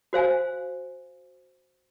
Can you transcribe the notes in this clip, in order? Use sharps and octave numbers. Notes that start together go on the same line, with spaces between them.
F#4 C5 F5 G#5